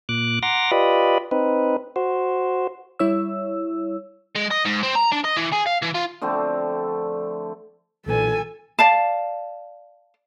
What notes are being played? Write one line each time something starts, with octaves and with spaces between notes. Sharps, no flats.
A#2 D6 F#6
F#5 A#5 C6 D6 A#6
F4 G4 B4 D5 D#5 B5
C4 D#4 B4
F#4 C5
G3 E4 C#5 E6
G#3
D#5
G#2
C4
A#5
D4
D#5
E3
G#4
F5
E3
F4
D3 F3 A3 C4
B1 A#2 E3 A4 G#5
D5 F5 A5